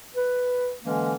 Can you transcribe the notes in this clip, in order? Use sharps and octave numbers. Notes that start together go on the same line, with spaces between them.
B4
D3 E3 G#3 A#3 C#4